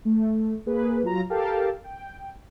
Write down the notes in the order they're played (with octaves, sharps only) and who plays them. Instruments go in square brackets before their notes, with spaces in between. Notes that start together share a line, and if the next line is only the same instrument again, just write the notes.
[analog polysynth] A3
A#3 G#4 B4
F#3 F4 A#5
G4 A4 A#4 F5 G5 A5
G5